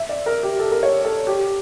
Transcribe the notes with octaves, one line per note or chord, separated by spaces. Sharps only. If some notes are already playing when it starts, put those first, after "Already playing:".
Already playing: E5
D5
A#4
G4
A4
A#4
C#5
A4
G4